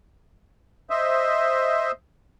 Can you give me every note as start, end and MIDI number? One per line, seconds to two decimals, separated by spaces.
0.90 1.92 72
0.90 1.92 75
0.90 1.92 76